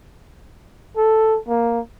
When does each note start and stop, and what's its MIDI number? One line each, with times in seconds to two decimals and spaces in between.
0.97 1.39 69
1.48 1.79 58